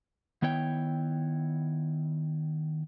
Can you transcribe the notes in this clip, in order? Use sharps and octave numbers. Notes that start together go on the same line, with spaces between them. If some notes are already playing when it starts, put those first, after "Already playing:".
D#3 B3 E4 C#5 G5